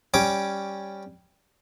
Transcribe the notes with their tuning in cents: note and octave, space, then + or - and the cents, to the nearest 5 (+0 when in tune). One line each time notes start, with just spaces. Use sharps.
G3 +0 C#4 +0 D6 +0